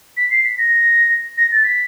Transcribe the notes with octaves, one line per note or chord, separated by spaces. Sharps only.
B6
C7
B6
A#6
A#6
A6
B6